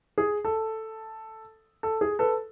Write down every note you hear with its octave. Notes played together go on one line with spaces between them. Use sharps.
G#4
A4
A4
G#4
A4 B4